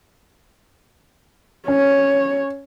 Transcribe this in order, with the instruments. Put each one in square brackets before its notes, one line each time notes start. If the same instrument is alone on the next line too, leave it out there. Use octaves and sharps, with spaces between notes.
[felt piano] C#4 [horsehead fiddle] C#5